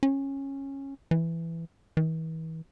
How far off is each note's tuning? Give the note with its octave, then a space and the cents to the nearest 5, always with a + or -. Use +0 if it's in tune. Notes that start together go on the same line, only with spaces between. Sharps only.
C#4 -15
E3 +10
E3 -40